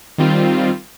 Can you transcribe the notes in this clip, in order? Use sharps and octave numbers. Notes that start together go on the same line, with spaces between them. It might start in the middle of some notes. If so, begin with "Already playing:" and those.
D#3 G3 C4 F4